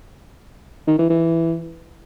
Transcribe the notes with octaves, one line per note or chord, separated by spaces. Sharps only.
D#3
E3
E3